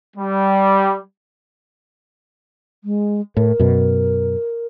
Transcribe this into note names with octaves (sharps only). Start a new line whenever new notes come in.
G3
G#3
A2 A#4
F#2 B2